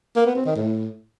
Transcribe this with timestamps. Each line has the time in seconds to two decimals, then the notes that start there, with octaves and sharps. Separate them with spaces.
0.16 A#3
0.26 B3
0.36 C4
0.46 D#3
0.56 A2